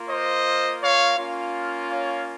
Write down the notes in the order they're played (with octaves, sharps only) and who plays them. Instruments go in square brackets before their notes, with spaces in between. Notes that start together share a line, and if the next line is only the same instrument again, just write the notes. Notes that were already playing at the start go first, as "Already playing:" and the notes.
Already playing: [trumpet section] A#3 F4
C5 D#5
C#5 F5
A#3 C#4 F4
C#5 F5